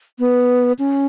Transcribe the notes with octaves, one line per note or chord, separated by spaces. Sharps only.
B3
C#4